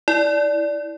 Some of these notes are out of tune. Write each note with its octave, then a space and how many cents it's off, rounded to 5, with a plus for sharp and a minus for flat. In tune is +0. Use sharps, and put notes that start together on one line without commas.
E4 -10 D5 -10